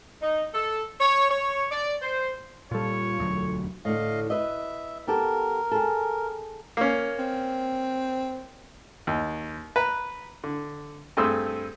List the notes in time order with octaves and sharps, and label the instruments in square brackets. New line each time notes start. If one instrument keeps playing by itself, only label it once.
[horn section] D#4
A4
C#5
C#5
D5
C5
[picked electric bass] A#2 G3 [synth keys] F4 A4 [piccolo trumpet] C#5
[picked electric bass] E1 D2 F#3
[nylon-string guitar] A2 D3 [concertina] D#5 F5
[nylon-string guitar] B4 D#5 [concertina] E5
[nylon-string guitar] B3 G4 A4 [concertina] A#4
[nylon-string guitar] G#4 A4
[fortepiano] A#3 C#4
[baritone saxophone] C4
[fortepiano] D#2
B4 A#5
D3
G2 A3 C4 G#4 C6 E6